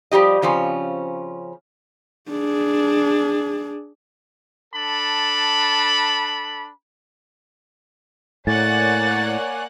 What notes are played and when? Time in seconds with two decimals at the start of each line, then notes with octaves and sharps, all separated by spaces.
0.12 F3 G3 G4 D#5
0.42 C#3 F3 C4 C#4
2.30 D4 G#4
4.73 D4 A4 B5
8.47 A2 A#3 C#5 D5 F#5 G#5 F#6 A6